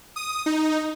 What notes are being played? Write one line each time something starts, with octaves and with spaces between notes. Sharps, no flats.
D#6
D#4